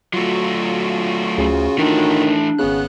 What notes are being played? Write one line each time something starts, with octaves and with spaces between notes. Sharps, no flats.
F#3 A3 F4 F#4
D2 C#3
D#3 E3 A3 D4
G#1 C#3 B3 F#6